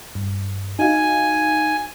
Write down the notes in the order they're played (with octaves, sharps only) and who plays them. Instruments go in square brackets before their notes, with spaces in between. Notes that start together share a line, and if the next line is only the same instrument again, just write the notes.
[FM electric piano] G2
[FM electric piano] D#4 F#4 F5 [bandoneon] G#5